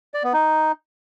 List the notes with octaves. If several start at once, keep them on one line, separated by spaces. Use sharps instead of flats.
D5
B3
D#4